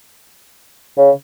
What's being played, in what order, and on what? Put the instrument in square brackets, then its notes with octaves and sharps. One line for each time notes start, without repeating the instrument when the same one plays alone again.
[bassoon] C#3